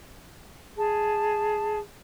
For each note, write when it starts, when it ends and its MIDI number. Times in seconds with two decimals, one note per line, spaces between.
0.76 1.78 68
0.76 1.78 81